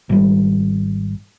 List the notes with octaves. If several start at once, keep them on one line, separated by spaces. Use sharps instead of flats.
G#1 G3